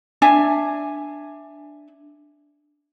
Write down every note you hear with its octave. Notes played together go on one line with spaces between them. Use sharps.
D4 E5 G#5